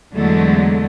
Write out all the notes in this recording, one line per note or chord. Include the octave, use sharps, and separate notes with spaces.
E2 D3 F#3 G#3 A3